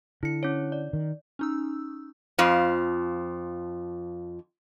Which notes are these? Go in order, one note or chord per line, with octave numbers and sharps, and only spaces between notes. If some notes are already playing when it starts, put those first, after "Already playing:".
D3 E4 C#7
C#4 E4 C#5
D5
D#3
C#4 D#4 E6
F2 F3